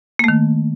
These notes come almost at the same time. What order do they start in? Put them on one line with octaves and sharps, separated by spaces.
A#3 A3 D#3